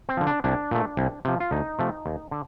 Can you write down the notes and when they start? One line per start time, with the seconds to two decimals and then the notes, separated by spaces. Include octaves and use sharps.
0.09 C4
0.17 D3 F3
0.27 D4
0.44 C2 D4
0.71 A#2 A3
0.97 C2
1.25 C3 F3
1.40 F4
1.51 D2 D#4
1.79 C3 F3 A3
2.06 D#2
2.31 D3